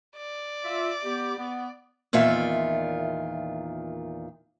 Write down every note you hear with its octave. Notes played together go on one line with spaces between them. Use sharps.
D5
F4 E5
B3 G4
B3
E2 A#2 D#3 F4 E5